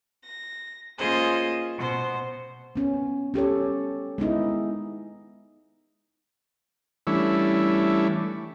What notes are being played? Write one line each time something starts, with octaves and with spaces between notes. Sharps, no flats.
A#6
A#3 C#4 F4 G#4 C5 D#5
B2 C5
B3 C#4
C#4 G4 A4 C#5
G#3 B3 D#4 E4
E3 G3 A3 C#4 D4 E4